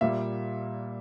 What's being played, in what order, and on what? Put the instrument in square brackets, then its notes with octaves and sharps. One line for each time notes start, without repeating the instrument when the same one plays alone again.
[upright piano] A#2 G3 A#3 E5